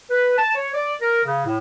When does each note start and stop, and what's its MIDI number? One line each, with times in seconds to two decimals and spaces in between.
0.10 0.36 71
0.38 0.51 81
0.55 0.70 73
0.74 0.93 74
1.01 1.21 70
1.25 1.46 49
1.46 1.58 45